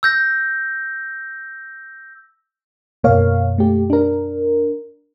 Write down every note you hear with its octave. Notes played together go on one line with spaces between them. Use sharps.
E6 G6 A#6
F#2 B2 A#3 A#4 C#5 F5
A3 G4
D4 A#4